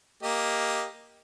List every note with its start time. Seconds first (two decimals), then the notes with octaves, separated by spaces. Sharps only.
0.23 A#3 G4 D#5